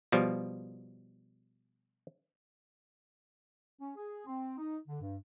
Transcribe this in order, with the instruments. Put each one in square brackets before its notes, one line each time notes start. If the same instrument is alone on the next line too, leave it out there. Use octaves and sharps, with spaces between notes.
[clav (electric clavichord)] B2 F3 G3
[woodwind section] C#4
G#4
C4
D#4
D3
G2